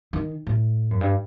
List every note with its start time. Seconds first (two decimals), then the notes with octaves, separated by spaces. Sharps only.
0.13 D#3
0.47 A2
0.91 F#2
1.01 G2